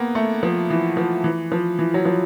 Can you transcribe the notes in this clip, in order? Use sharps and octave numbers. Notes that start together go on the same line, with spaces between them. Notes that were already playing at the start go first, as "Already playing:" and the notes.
Already playing: A#3 B3
A3
F3
E3
F3
E3
F3
E3
F#3
F3